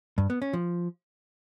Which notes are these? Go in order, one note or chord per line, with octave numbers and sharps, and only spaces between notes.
G2
B3
C#4
F3